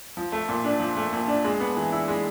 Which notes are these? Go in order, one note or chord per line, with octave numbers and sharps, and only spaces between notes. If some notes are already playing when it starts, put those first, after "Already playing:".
F3
A3
A#2
D4
F3
A3
A#2
D4
G#3
B3
E3
E4
G#3